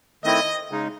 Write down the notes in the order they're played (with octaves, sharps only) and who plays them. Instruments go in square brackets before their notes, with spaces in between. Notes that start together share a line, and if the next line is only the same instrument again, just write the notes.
[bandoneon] D#3 A3 C4 E4 [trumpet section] D#5
[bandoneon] C#3 G#3 D#4